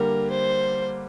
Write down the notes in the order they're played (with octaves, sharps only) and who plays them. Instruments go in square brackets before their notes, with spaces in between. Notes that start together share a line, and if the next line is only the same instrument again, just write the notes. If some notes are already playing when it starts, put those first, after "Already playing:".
Already playing: [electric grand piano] D3 G3 A#3 [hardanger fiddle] A#4
[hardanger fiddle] C5